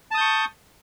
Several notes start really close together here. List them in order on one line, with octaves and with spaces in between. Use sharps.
A5 D#6 G6 C#6